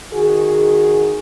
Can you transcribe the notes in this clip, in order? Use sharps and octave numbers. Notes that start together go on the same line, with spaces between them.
D#3 F#4 G#4